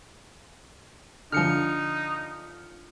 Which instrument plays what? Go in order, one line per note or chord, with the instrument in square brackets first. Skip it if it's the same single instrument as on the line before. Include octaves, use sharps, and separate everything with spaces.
[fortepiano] D3 F3 [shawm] D#4 [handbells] F6 C#7